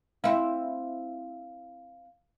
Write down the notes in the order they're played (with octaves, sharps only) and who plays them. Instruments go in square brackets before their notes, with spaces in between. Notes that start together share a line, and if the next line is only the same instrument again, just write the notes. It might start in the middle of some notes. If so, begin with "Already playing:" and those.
[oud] C4 E4 [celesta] F5